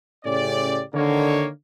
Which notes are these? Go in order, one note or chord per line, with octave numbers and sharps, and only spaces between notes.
A2 C#3 C#4 G4 D5
D3 D#3 A#3 C#5